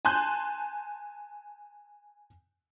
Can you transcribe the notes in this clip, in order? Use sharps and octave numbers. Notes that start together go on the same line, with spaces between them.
G#5 A5 C6 F#6 G6